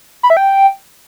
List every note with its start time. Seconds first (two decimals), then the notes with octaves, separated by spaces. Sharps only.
0.23 B5
0.30 E5
0.37 G5